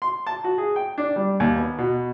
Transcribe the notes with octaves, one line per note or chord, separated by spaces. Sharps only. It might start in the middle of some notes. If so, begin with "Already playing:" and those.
C6
A5
F#4
G#4
G5
D4
G3
D#2
B3
B2